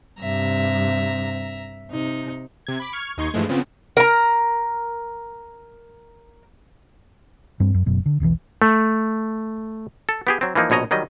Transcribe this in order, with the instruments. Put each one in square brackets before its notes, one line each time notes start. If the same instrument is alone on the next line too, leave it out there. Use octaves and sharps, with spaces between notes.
[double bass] G2 C3 [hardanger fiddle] E5 A#5
[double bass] C3 [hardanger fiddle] D#4
[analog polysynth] C3 G#6
B5 D6
C#6 F6 G#6
D#2 D#4 C6 C#6 G#6
G2 E3 F3 G#3 A3
C#3 F3 B3 C4
[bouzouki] A#4 A#5
[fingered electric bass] G2 G3 C4
F#2
F#1 F#2 B2
D3
E1 B1 C3 E3
[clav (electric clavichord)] A3
A4
B3 G4 G#4
F#3 C4
E3 F3 A#3 D#4
A#1 B2 C#5 D#5 A#5
D#3 F#3 G3 D#5